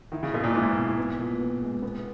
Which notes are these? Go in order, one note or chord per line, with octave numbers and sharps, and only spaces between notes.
D#3 E4
C#3
B2 A#3
A#2
G#2 E4
B2
B3
A#2
B3
G#3
B3